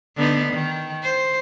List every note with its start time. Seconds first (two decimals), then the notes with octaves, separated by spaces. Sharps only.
0.17 D3 B3 D#4
0.53 D#3
1.03 C5